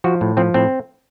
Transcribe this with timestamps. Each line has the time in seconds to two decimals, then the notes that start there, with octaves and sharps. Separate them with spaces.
0.04 F3 F#4
0.21 A2
0.37 F3 C4
0.54 A2 C4